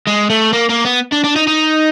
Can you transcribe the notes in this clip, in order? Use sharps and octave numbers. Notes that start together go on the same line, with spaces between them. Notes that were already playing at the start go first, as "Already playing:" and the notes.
G#3
A3
A#3
A#3
B3
D4
D4
D#4
D#4